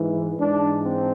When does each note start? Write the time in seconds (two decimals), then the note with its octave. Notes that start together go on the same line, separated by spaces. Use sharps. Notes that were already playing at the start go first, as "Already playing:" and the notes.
Already playing: G#2 E3
0.38 G#2 E3 D4
0.82 C4